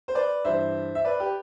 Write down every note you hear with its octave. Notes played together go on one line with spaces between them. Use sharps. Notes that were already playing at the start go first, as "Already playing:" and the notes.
C5
B4 D5
G2 E3 C5 E5
E5
B4 D5
G4 B4